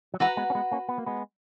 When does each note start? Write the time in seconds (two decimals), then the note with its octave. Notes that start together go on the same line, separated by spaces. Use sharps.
0.14 F#3
0.20 E3 G#3 F#4 B4 F#5 A#5
0.37 G#3 B3
0.50 C#4
0.55 G#3 B3
0.72 A#3 C#4
0.89 B3
0.98 A#3
1.06 G#3 B3